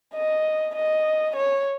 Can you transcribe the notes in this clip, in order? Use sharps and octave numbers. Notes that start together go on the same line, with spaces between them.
D#5
D#5
C#5